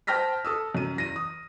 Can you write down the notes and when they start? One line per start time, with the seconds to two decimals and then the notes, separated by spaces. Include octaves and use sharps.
0.07 C5 G5 A5 F6 A#6 B6
0.45 A4 D#6 E6
0.75 F#2 D#7
0.97 E2 A#6 D#7
1.16 D#6